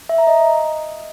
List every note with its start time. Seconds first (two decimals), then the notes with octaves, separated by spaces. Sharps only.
0.09 E5
0.18 A#5
0.27 D#5